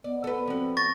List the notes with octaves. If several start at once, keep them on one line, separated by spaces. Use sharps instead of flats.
B3 D5
A4 B4
F3 C4 F#4
C#6 A6 A#6